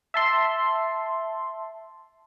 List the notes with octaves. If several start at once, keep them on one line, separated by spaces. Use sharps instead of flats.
E5 A5 C6